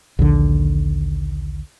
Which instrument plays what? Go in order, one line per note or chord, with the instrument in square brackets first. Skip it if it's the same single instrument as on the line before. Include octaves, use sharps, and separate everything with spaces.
[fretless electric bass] A#1 D#2 D3